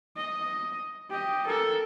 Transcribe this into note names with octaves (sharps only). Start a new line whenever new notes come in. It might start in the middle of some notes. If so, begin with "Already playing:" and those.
D#5
G4 D#5
A4 A#4